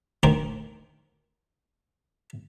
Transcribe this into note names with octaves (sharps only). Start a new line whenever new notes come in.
D2 D#3 A#4 C5 G5 D6